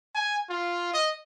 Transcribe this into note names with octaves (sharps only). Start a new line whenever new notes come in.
G#5
F4
D#5